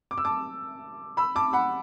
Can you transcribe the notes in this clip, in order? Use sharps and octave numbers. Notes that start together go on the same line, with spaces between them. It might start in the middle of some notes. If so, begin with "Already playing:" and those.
D6
E6
A5 D6
B5 E6
A5 D6
F#5 B5